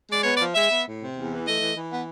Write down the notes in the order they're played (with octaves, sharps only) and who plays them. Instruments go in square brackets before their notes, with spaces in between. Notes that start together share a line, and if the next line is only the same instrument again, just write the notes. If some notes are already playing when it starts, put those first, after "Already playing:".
[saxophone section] G#3 D5
B3 C#5
F3 D5
G#3 E5
B3
A2
C3
E2
E3
A3 D#5
E3
E3
B3